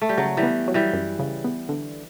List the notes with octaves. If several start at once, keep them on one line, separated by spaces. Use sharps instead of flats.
A3
G3
C#3 F#3
E3 G3
B3
F#3
E3 G3
F#2
C#3
B3
D3